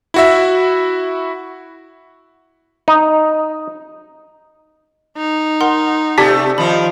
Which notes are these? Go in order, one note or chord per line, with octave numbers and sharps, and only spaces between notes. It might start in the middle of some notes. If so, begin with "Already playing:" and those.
E4 F#4 E5
D#4
D#4
A#4 F#5 C6
C3 A3 G4 D5 A5 G#6 B6
D#3 F3 D#4 B5